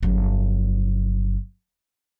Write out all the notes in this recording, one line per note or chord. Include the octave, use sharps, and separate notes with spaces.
G1 F#3